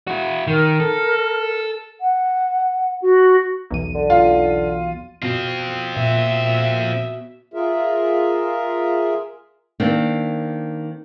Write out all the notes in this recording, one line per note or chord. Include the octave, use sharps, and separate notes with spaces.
E4 F#4
D#3 A#4
A4
F#5
F#4
B1 E2 D#7
D3
F4
B2 C4 F4
A#2 E5
F4 G#4 A#4 E5
D#3 A#3 C4 D4